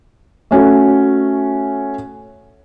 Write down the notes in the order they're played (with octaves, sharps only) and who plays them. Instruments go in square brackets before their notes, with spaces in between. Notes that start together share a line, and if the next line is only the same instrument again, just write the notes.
[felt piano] A3 C#4 F#4